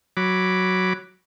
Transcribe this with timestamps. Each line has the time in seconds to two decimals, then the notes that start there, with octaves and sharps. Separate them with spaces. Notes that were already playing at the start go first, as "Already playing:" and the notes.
0.17 F#3 B5 D6